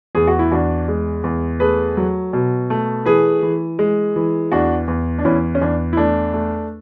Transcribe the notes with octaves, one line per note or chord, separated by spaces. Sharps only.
E2 G#4
F#4
E4
E2 D4 F#4
G#3
E2
A3 G#4 B4
F#3
B2
A3
E3 G#4 B4
E3
G#3
E3
E2 D4 F#4
E2
D4
E2 C#4 E4
C#4
E2 D4
E4
A3 D4
A3